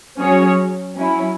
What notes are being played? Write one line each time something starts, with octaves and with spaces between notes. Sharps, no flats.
F#3 C#4 G#4 C#5
F#3 C#4 E4